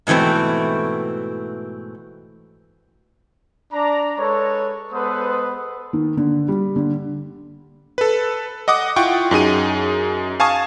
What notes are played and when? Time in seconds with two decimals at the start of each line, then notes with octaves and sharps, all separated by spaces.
0.07 G#2 B2 E3 A3 C4
3.73 D4 D5 A#5
4.18 G#3 A4 B4 C#5
4.92 G#3 B3 A4 B4 C5 D#6
5.93 D#3
6.17 D3
6.48 G3
6.76 D3
7.98 A4 B4
8.68 D#5 F#5 D6 D#6
8.96 E4 F4 F#5 G5 C#6
9.31 F#2 D#4 G#4 D#7
10.40 F5 G#5 A5 C#6 D#6